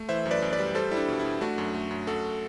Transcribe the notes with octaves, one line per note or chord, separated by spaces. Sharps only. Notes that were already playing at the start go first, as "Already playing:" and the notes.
Already playing: A3
E3 C5 E5
F#2
B4 D5
F#2
B4 D5
G3
G3 A4 C5
G3 E4
D4
B2
E4
B2
A3 D4 F#4
F#2
A3
F#2
F#2 F#4 A4